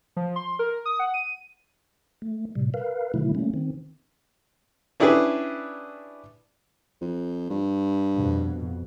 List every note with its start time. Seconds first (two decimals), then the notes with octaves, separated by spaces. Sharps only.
0.16 F3
0.36 C6
0.59 A#4
0.85 D#6
0.99 F#5
1.14 D#7
2.22 A3
2.55 A2 C3 G3
2.74 A#4 B4 F5
3.14 B2 D3 D#3 F#3 A3 E4
3.35 G3 A3 A#3 C#4
3.54 D#3 C4
5.00 C#4 D4 E4 G4 G#4 B4
7.01 F2
7.50 G2
8.15 F2 B2